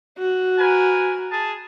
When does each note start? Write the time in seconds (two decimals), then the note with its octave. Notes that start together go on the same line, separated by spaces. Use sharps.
0.18 F#4
0.58 A#4 B4 G#5
1.30 G#4 A5